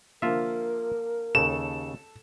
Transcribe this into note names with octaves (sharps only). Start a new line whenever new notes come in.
D3 F3 A#3 F4 A#4 E5
D#2 C#3 A4 E7